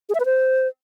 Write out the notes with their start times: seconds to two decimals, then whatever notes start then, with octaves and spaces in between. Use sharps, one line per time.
0.09 G#4
0.15 E5
0.20 B4
0.25 C5